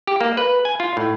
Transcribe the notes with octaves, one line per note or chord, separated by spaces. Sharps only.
G4
A#3
B4
G#5
F4
A2